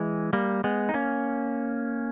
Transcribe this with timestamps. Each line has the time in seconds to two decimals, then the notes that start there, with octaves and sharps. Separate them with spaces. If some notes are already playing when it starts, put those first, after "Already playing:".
Already playing: E3 G#3
0.33 G3 A#3
0.64 G#3 B3
0.89 D#4
0.94 A#3 C#4